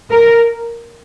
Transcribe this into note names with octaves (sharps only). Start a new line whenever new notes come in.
A#4